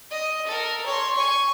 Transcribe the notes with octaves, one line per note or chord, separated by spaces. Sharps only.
D#5
A4 A#4
C#5 C6
G#5 C#6